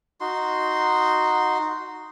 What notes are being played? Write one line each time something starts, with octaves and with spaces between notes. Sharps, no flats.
D#4 F#4 C6